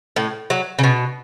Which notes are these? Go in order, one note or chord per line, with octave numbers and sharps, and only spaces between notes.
A2
F#3
C#3
B2